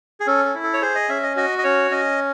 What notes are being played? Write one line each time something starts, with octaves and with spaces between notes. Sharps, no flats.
G#4
C#4 A4
A4
E4
A4
C#5
G#4 C5
D#5
C#4 E5
D#5
F#4 D#5
D#5
C#4 C#5
C#4 D#5